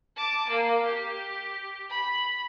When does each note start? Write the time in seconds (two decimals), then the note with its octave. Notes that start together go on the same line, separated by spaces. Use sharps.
0.16 A5 D6
0.49 A#3
0.86 G4
1.90 B5